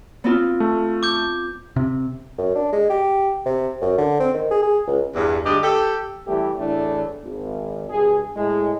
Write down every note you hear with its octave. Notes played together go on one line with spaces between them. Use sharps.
B3 C4 F4
A3
D6 G6
C3
F#2
D4
G#3
G4
C3
F#2
D3
C4
D#3
G#4
G#4
C#2
E2 G2
D2 G2 G#3 G4 D5 D#5
G4 A4
E3 G3 A3 B3 G4
E2 A2 E3 A3 D4
G#1
G2 B2 G#4
A2 G#3